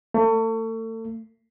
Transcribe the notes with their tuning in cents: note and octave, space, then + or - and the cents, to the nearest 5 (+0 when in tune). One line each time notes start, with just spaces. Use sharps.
A3 +35